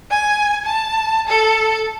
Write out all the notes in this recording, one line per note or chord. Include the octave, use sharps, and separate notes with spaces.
G#5
A5
A4